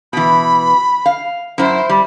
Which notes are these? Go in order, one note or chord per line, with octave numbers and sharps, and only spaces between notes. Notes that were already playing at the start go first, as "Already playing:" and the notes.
B2 E3 B5
F5
F#2 E4 C5
G3